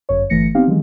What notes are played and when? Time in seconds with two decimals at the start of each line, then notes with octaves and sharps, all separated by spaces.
0.09 G1 F#2 C#5
0.30 G1 E3 A3 A#6 C#7
0.55 B3 C4 D#4 G4 F5
0.67 D#3 E3 F#3 G#3